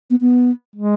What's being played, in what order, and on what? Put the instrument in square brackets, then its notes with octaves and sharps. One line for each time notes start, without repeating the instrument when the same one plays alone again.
[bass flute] B3
B3
[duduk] G#3